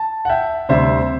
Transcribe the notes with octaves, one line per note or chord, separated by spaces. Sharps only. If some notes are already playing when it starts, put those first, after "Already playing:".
Already playing: A5
F#5
E5 G5
D2 C3 G3 C4 C5 E5